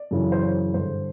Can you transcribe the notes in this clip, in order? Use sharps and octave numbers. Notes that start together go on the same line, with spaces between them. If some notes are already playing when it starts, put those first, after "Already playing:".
Already playing: D5
F#2 C#3 E3
C5
C#5
G2 D3 C5